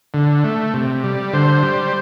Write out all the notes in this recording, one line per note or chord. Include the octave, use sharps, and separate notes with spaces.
D3
A3
C3
G3
D3 C5
G3